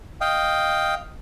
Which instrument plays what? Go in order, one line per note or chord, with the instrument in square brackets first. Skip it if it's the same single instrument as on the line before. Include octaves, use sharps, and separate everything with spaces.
[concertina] D#5 F5 G5